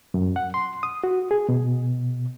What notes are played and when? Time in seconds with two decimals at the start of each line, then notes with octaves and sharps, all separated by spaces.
0.14 F#2
0.36 F#5
0.54 C6
0.83 D#6
1.04 F#4
1.31 G#4
1.49 B2